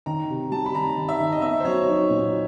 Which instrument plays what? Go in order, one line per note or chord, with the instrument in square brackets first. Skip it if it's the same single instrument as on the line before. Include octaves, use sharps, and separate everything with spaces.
[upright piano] D#3 [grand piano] A#5
[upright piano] C3
[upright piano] G3 [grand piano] A5
[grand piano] B5
[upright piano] D#3 [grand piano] A#5
[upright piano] D#3
[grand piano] E5
[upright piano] D#3
[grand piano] D#5
[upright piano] B3 [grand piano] E5
[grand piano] C5
[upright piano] F#3 [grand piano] C#5
[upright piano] D#4
A#2